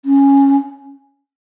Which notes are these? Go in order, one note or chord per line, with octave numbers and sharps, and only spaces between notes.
C#4